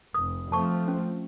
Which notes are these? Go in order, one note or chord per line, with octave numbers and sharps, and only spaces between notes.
F1 D#6
F3 A3 C4 A5 C#6
C#4